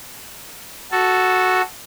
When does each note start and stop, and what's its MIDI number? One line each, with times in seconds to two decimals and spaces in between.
0.92 1.62 66
0.92 1.62 69